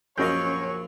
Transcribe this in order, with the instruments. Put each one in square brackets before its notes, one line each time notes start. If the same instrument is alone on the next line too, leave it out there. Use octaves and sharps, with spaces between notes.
[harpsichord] A#1 A#3 F5 [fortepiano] F#2 D#5 [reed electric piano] C#4 G6 [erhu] C#5